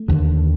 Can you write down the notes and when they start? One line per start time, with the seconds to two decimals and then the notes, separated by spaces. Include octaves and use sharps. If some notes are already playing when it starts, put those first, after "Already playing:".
Already playing: A3
0.08 D#2 D3